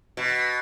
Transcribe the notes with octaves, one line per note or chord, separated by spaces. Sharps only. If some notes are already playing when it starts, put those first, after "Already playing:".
B2